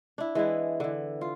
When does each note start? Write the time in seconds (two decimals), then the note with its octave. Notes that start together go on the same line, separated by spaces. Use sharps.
0.18 D4 E4
0.35 E3 G#3 B3 E4
0.80 D3 E3
1.21 F4